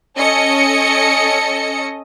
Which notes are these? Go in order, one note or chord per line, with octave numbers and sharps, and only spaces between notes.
C#4 A4 D#5 C#7